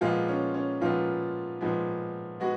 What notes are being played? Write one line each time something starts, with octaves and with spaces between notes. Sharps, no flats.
A#2 F3 G#3 B3 F4
C#4
C#4
A#2 F3 G#3 B3 F4
A#2 F3 G#3 B3
G#3 B3 F#4